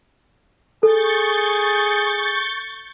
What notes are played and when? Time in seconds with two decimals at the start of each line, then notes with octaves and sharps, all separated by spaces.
0.83 G#4 A4 C#6 G6 A6